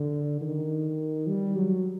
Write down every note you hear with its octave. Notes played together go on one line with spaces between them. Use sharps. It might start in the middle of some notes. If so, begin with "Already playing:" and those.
Already playing: D3
D#3
G3
F#3